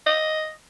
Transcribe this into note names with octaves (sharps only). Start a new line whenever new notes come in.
D#5